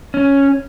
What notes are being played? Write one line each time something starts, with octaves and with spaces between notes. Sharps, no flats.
C#4